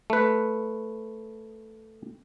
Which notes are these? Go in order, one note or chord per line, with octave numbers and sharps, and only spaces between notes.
A3 B4